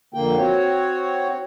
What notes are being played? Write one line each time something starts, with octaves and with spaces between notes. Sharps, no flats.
F2 D3 A#3 G5
C4 F#4 C#5